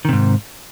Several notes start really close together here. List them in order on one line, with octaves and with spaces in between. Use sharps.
D#3 C3 G#2